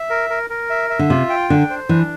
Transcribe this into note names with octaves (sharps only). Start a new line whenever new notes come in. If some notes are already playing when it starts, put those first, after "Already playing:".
Already playing: E5
A#4
A#4
A#4
E5
E5
D3
C3 F4
G5
D3 D4
C5
E3 D4